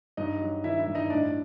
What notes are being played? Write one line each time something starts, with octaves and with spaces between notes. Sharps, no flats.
G2 D#4 D#5
F#3
D#3 E4 E5
E4 E5
G2
D#4 D#5
A2 D4 D5